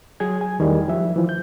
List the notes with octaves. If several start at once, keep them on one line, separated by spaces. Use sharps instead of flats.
F#3 G#4 G#6
G#5
E2 D#3 E3 G3 A3
F3 E5
E3 F3
G6